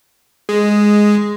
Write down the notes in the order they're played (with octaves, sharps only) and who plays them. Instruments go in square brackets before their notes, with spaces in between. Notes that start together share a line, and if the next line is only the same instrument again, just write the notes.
[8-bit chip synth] G#3